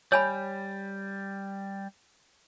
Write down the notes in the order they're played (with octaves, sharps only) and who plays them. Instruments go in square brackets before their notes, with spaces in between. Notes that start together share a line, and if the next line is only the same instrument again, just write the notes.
[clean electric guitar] G3 [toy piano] C#5 G#5 B5